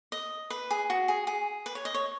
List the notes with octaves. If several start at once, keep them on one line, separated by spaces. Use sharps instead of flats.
D#5
B4
G#4
F#4
G#4
G#4
B4
C#5
D#5
C#5